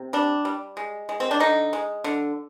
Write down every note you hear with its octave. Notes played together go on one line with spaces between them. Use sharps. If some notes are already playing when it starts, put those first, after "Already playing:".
Already playing: C3
G3 D4
G3
G#3
G#3
C4
D4
D3 D#4
G#3
D3